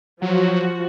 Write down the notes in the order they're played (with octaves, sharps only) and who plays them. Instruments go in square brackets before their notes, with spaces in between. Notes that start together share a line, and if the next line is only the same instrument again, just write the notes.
[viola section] F3 F#4 [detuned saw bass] F#3